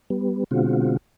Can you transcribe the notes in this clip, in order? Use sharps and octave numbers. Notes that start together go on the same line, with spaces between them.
G3 B3
B2 D3 G#3 C4 F4 F#4